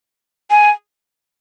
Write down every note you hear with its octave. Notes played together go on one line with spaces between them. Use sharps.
G#5